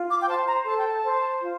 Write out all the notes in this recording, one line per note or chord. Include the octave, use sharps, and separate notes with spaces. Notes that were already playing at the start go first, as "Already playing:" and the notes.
Already playing: F4
D6
G5
C5 A5
A#5
A4 A5
G5
A5
C5
F4